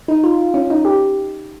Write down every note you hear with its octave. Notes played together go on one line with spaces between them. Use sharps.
D#4
F4
C#4
D#4
G4